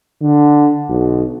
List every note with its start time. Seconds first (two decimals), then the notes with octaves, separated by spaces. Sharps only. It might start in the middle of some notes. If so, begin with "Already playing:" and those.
0.22 D3
0.89 B1